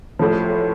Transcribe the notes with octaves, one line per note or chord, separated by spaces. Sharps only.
A1 A2 F3